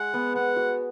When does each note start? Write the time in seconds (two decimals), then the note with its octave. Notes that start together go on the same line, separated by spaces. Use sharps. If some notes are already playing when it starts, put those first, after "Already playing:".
Already playing: G#3 F#5
0.14 B3
0.35 B3 F#5
0.56 F#4